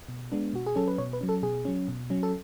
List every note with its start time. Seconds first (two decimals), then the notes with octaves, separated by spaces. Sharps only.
0.09 B2
0.32 G#3 B3 D4
0.53 B2 F#4
0.66 G#4
0.76 F#3 C#4 A4
0.88 B4
0.98 B2 C#5
1.13 B4
1.21 F#3 C#4
1.29 A4
1.43 B2 G#4
1.65 F#3 C#4
1.88 B2
2.10 F#3 C#4
2.23 A4